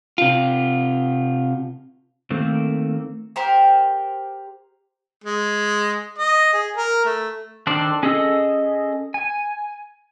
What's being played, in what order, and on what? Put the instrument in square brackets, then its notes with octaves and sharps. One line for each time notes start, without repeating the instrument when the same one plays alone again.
[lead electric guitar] C3 F4
[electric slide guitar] D#3 A3 A#3 C4
[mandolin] G4 A#4 C5
[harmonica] G#3
D#5
G#4
A#4
A3
[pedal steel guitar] D#3 D4 A4 C5 D5
C#4 G#4 A4 D#5 E6
G#5